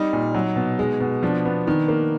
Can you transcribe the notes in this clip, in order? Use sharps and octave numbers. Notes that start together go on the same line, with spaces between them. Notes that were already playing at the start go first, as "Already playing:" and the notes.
Already playing: G3 D#4
A#2
F#3
B2
G#3
B2
F3 D4
B3
D#3
A#3